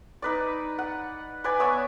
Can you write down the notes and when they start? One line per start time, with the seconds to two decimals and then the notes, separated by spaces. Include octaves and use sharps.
0.22 D#4 B4 D5
0.78 F#5
1.44 B4 D5 G#5
1.60 B3 C#5 E5 D#6